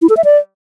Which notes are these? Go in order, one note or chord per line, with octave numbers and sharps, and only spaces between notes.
E4
A4
E5
D5